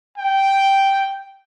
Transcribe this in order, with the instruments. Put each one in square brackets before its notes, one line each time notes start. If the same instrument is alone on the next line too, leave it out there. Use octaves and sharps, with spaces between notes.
[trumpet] G5